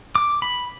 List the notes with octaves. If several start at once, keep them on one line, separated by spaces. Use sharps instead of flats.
D6
B5